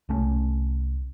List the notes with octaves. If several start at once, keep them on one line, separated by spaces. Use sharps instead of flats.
C2 A3 C#4